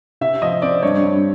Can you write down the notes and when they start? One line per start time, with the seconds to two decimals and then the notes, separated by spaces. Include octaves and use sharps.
0.21 C3 E5
0.42 F3 D#5
0.62 C4 D5
0.83 G2 C#5
1.04 G2